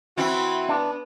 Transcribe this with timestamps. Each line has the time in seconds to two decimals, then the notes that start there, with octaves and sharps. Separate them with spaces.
0.17 E3 C4 E4 F#4 B5
0.69 B3 D4